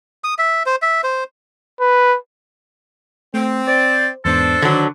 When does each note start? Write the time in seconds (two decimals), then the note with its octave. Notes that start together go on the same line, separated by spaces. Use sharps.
0.24 D#6
0.39 E5
0.66 C5
0.82 E5
1.04 C5
1.80 B4
3.34 A3 C4
3.68 C5 D5
4.25 E2 G#2 B3 D4 A4 C5
4.62 D3 D#3 F#3